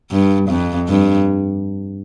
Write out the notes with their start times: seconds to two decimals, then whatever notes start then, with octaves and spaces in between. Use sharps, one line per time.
0.11 G2
0.49 F2
0.88 G2